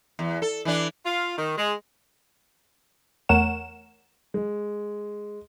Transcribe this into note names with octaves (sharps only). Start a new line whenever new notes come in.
E2
A4
E3 D4
F4
D#3
G#3
E2 A3 A#4 C#5 F#5 E7
G#3